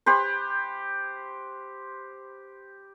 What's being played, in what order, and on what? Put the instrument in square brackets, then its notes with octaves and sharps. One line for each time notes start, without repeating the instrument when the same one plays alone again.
[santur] G4 B4 C5